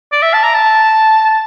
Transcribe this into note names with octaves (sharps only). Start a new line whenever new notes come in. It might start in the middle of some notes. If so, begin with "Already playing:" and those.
D5
E5
A5
A#5
A5